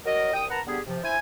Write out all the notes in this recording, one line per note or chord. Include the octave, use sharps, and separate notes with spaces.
F#3 A#4 D#5
C2 G5 D#6
A#4 B4 F#5 A5 A#5
D3 G3 B3 G4 G#4
C3 F3
E4 C5 E5 G#5